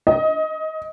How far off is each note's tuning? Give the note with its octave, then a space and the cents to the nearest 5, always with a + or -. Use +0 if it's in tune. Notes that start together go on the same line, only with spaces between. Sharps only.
D#5 +15